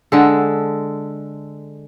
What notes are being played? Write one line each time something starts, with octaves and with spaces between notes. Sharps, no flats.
D3 G#3 A4